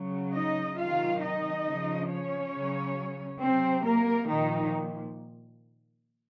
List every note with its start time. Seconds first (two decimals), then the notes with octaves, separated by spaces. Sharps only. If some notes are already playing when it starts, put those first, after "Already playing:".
Already playing: C#3 F#3
0.35 D#4 D#5
0.79 C3 D#3 F#3 F4 F5
1.23 D#4 D#5
1.66 C#3 F3
2.10 C#4 C#5
2.54 C#3 F#3
3.41 C3 F#3 C4 C5
3.85 A#3 A#4
4.29 A#2 D#3 F3 D#4